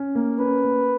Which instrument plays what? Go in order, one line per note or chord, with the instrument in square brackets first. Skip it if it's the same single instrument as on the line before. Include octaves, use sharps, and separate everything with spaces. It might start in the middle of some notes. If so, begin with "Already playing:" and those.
Already playing: [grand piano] C#4
A#3
[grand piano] C#4 [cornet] B4
[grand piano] A#3